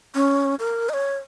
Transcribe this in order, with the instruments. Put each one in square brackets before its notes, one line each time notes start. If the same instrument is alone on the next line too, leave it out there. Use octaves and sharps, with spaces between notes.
[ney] C#4
A#4
D#5
C#5